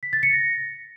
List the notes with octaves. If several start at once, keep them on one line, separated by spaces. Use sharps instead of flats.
B6
A6
C#7
A#6